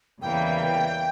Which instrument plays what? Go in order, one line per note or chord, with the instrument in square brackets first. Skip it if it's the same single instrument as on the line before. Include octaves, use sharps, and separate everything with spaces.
[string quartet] E2 C#3 E3 G3 A#3 [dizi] G5